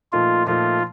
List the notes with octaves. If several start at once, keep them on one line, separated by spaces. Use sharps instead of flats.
A#2 F3 A3 D#4 F4
A#2 F3 A3 D#4 F4